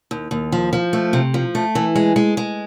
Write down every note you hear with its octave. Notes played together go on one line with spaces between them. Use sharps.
D#2
D#2
F3
F3
A3
C3
F3
A3
E3
G#3
G#3
G#3